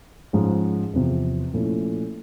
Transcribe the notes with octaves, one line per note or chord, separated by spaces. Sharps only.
G#2 F3 G#3 C#4
E2 C3 F3
A#2 F3 A3 C#4 E4